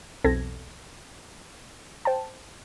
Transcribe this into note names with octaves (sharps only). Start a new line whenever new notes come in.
B1 E2 C4 A4 G#6 A#6
C5 G5 A5